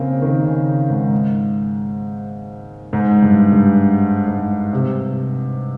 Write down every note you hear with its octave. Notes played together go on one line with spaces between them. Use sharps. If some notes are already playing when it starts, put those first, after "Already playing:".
Already playing: C#3 A#3 C4
D#3
C#3
G#2
G#2
G2
G2
G#2
C3